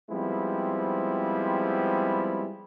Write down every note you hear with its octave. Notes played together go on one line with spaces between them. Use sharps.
F3 G3 G#3 B3 C4 E4